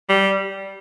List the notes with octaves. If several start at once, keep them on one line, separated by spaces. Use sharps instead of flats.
G3